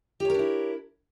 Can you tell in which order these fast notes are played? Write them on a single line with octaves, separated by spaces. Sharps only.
G4 C#5 A#4 D4 E4